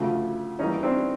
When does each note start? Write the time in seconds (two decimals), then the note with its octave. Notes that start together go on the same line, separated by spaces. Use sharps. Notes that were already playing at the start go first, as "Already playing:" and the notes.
Already playing: D2 C#3 F3 A3
0.59 G#2 E3 G3 A#3 C#4 D#4
0.83 C4 D4